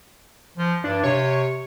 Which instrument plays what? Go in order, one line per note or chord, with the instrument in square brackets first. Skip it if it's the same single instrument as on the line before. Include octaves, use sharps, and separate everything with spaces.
[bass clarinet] F3
[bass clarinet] G2 [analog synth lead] D4
[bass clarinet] C3 [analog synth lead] C#5